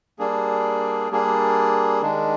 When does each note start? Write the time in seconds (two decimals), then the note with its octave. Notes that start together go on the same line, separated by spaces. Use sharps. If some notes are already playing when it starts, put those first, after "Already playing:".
0.19 G3 A#3 D4 G#4
1.11 G3 A#3 D4 G#4
2.01 D#3 G#3 D4